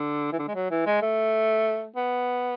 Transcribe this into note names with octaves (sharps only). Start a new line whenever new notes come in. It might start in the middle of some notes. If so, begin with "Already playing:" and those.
Already playing: D3
E3
D3
G#3
F#3
E3
G#3
A3
B3